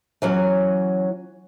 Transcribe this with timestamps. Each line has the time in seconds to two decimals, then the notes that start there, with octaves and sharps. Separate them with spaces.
0.22 E3 F#3 C#4